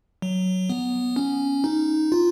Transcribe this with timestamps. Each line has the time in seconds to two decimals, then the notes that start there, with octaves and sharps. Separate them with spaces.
0.22 F#3
0.70 B3
1.16 C#4
1.64 D#4
2.12 F4